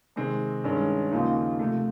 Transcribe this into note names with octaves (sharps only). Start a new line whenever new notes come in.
C3 D#3 G#3 C4
G2 D#3 G#3 C#4
D#2 C#3 F3 A#3 D#4
C3 F3 A3